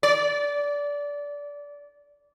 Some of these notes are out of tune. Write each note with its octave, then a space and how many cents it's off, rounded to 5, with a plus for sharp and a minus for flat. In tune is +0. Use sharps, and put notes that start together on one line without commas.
D5 -20